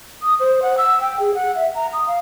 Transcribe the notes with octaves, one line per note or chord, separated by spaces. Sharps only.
D#6
C5
F#5
E6
G5
G#4
F#5
E5
A#5
D#6
F5